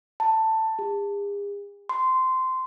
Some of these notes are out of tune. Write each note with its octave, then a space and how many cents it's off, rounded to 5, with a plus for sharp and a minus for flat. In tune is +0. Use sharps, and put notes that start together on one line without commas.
A5 +10
G#4 -45
C6 -15